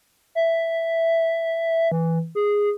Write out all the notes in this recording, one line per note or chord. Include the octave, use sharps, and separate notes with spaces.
E5
E3
G#4